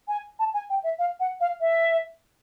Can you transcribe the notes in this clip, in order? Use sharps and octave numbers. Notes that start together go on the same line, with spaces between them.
G#5
A5
G#5
G5
E5
F5
F#5
F5
E5